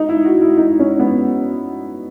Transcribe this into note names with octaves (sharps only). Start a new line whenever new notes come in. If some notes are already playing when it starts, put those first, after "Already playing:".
Already playing: D#4
E4
F#4
E4
D#4
C#4
B3